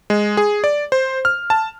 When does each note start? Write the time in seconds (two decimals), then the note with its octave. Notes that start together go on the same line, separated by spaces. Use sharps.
0.10 G#3
0.37 G#4
0.64 D5
0.92 C5
1.25 F6
1.50 A5